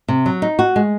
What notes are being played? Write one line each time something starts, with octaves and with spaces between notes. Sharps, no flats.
C3
F#3
D#4
F#4
G#3